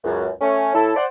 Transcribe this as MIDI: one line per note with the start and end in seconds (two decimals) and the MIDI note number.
0.04 0.28 37
0.04 0.28 42
0.41 0.72 57
0.41 0.72 61
0.74 0.92 45
0.74 0.92 64
0.74 0.92 69
0.96 1.05 72
0.96 1.05 74
0.96 1.05 78